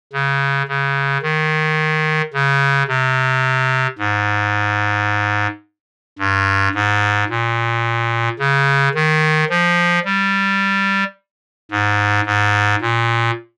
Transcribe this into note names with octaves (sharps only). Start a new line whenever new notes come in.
C#3
C#3
D#3
C#3
C3
G#2
G2
G#2
A#2
C#3
D#3
F3
G3
G#2
G#2
A#2